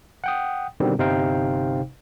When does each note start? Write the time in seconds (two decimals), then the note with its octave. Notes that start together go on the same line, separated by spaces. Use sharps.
0.24 F#5 G5 D#6
0.80 B2 D3 D#3 G3 C4
0.98 G1 C3 D#4 C5 F5 G5